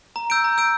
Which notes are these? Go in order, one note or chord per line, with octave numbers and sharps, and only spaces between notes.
A#5
E6 G6 D7
A#5
E6 G6 D7